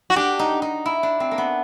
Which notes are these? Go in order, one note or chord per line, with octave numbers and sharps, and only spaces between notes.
F#4
D4 G4
D#4
D#4
E4
D4
C4
A#3
B3